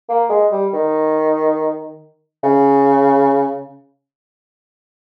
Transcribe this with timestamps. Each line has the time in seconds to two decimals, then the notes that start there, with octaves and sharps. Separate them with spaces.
0.09 A#3
0.29 G#3
0.51 G3
0.73 D#3
2.43 C#3